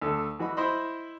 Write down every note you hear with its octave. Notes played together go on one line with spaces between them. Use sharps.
D2 A4
E3 F#4 D#5 B5
E4 C5 D#5 B5